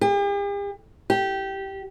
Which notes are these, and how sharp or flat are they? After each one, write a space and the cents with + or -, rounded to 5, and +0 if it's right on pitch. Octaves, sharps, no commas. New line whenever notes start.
G4 +45
G4 -15